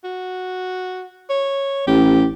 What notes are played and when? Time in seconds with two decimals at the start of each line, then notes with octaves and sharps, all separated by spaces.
0.04 F#4
1.30 C#5
1.87 A1 G4